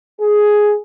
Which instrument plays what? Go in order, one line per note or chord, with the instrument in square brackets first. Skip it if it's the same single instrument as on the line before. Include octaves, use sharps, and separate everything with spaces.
[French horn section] G#4